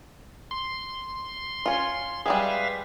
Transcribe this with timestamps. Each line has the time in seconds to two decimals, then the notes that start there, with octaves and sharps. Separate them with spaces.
0.51 C6
1.66 C#4 F4
2.26 G3 G#3 G#4 B4 E5 F5